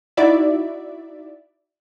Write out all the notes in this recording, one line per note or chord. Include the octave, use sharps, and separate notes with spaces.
D#4 E4 F#4 D5 E5